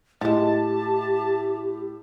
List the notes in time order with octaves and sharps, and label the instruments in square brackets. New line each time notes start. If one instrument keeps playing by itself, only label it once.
[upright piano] A2 [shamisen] F3 G#3 [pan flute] G4 [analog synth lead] A5